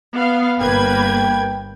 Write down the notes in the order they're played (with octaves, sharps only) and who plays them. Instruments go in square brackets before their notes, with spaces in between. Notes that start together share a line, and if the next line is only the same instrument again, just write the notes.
[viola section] B3 F5
[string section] G1 A#3 G#6 [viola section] B4 [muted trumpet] G5